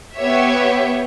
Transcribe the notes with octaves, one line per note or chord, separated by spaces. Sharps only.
B3 G4 C#5 E5